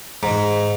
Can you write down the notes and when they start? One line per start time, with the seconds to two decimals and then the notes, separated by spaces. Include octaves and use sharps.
0.23 G#2